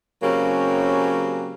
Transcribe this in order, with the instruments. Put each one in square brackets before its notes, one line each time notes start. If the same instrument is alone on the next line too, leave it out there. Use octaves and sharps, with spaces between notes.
[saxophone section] C#3 F#3 A#3 C4 C#4 G4